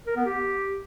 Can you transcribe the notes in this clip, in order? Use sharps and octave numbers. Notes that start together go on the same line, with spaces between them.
A#4
B3
G4